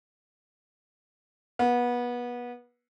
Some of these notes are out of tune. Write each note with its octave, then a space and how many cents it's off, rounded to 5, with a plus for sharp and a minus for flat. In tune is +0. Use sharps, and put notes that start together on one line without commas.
B3 -25